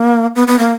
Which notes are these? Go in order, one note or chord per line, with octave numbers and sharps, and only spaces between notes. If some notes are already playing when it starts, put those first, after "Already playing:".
Already playing: A#3
B3
B3
A#3